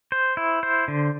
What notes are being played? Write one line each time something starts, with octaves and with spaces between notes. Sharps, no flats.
C5
E4
C5
D3